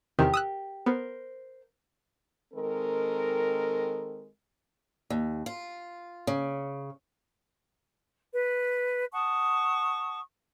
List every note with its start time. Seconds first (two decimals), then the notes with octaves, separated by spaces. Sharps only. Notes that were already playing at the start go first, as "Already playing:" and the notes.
0.19 E2 C3 D#3 G4 A#4
0.34 D#6 E6 F#6
0.86 B3 A#4 C5
2.54 D#3 G#3 C4 A4 A#4
5.10 D#2
5.46 F4
6.27 C#3
8.32 B4
9.13 F#5 A5 C#6 D#6